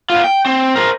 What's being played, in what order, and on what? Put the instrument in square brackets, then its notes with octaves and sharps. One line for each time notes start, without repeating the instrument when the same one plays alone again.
[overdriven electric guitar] B3 F4
G5
C4
A#4 C5